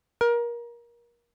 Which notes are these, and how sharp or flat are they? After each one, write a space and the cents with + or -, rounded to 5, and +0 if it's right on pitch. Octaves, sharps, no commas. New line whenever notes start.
A#4 +25